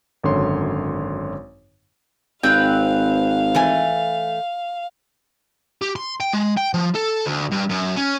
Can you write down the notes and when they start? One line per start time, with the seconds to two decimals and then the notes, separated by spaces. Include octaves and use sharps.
0.24 G#1 F#2 D3 C#5 C6
2.43 G#1 C4 B4 F5 G5
3.55 E3 A3 G#5
5.82 G4
5.96 C6
6.20 G5
6.33 G#3
6.57 G5
6.74 F3
6.95 A4
7.26 D2
7.51 G2
7.70 F#2
7.97 C#4